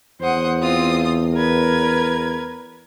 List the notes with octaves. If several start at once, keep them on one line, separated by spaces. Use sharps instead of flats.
E2 C5 F#5 D#6
C4 F4 D#6
A#4 B4 G#6